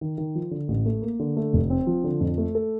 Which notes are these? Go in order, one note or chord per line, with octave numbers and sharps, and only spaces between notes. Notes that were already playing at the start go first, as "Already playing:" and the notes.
D#3
D#3
F3
D3
A1
A3
A#3
D3
A3
F1
C4
F3
D3
F2
A3
A4